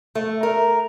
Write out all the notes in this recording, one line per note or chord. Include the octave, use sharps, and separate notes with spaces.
A3
A#4